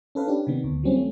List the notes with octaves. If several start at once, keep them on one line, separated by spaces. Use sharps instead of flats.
C#4 A4 B4 F5
C#4 D4 G4
C3 D#3 B3
D2
E3 F#3 G3 C4 C#4
A3